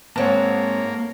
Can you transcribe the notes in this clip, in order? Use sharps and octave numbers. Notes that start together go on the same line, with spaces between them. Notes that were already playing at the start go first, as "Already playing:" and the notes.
G#2 A#3 C4 C#5 A5